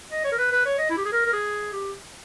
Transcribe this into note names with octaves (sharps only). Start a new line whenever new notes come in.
D#5
C#5
A#4
B4
B4
C#5
D#5
E4
G4
G#4
A#4
A#4
G#4
G4